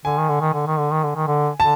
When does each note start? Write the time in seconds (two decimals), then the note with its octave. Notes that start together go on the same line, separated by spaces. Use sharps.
0.05 D3 G#5
0.18 D#3
0.29 D3
0.41 D#3
0.54 D3
0.67 D#3
0.79 D3
0.91 D#3
1.04 D3
1.16 D#3
1.27 D3
1.59 D3 A5